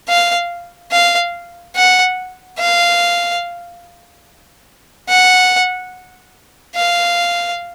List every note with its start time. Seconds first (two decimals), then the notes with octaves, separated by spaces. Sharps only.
0.09 F5
0.92 F5
1.76 F#5
2.59 F5
5.09 F#5
6.76 F5